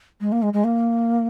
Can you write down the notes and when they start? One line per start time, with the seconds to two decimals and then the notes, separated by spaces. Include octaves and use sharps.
0.20 G#3
0.32 A#3
0.42 G#3
0.53 G#3
0.64 A#3